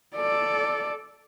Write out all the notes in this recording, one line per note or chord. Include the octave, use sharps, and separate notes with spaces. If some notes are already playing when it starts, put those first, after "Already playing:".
A4 D5